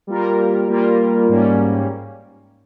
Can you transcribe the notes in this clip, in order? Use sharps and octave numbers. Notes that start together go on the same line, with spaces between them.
G3 A#3 F4 A#4
G3 A#3 F4 A#4
G#2 G3 A#3 C#4